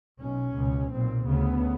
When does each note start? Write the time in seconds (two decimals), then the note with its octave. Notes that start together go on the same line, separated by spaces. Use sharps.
0.20 B1 B2 C#4
0.55 C#2 B2
0.90 B1 A#2 C4
1.26 D2 C#3 B3